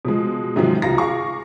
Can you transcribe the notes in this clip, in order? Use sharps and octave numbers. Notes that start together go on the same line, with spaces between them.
B2 F3 G#3
G#2 C3 D#3 F3 F#3 G#3
C#2 F4 F#4 A#5 A#6
G#4 F5 C#6 D6